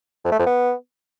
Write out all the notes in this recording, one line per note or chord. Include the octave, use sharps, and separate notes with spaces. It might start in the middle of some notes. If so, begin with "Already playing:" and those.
F2
A3
F2
B3